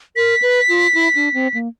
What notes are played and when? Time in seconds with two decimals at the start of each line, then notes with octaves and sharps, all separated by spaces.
0.16 A#4 B6
0.42 B4
0.69 F4
0.95 E4
1.15 D4
1.34 C4
1.54 A#3